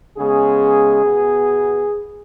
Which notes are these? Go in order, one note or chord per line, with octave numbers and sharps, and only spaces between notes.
C#3 G#3 B3 G#4
B2 B3